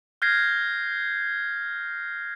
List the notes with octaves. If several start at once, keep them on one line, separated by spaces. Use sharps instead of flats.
F6 G6 G#6 A#6 C7